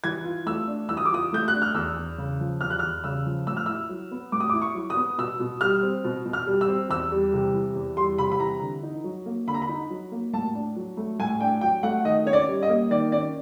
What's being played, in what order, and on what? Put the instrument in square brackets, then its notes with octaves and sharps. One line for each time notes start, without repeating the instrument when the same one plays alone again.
[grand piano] E3 G#6
F4
A3 E6
D4
E3 E6
D#6
D6
F4 D#6
A3 G6
F#6
D4
F6
E2 E6
E2
C#3
F3
E2 F6
F#6
F6
E2
C#3 E6
F3
A2 E6
F6
E4 E6
F#3
B3
A2 D6
D#6
D6
E4
C#6
F#3
D#6
B3
B2 E6
B2
G3 F6
C4
B2
B2
F6
G3
E6
C4
E2 E6
G3
C3
E3
E2
G3 C6
C3 B5
B5
E3 A#5
D3
D#4
F#3
A#3
D3 B5
A#5
B5
D#4
F#3
A#3
A2 A5
D4
F#3
A3
A2 G#5
D4 G5
F#3 G5
A3 F#5
D#3 D#5
C#4 C#5
D5
G3
D#5
A#3
D#3 D5
C#4 D5